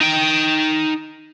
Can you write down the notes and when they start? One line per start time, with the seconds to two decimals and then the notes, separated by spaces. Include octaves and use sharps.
0.01 D#4 G5